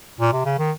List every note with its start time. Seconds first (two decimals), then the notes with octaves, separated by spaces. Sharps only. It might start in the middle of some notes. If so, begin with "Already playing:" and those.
0.20 A#2
0.33 C3
0.45 C#3
0.59 D#3